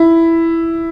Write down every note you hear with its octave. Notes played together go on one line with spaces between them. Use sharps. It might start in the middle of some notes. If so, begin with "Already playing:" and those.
Already playing: E4